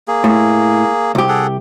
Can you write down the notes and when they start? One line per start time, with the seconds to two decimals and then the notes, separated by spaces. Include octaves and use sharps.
0.08 A#3 G#4
0.24 A2
1.15 C2 G4
1.29 G#4 A4 F#5